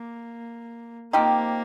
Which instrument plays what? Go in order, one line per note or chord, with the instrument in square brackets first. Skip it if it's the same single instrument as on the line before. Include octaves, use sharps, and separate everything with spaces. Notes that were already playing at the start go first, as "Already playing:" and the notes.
Already playing: [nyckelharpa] A#3
[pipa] F3 C4 D#4 G4 [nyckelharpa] A#3